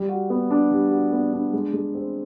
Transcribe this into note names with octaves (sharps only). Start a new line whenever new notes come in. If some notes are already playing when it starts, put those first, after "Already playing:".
Already playing: G3
F#4
B3
D4
G3
F#4
B3
D4
G#3
G#3
C4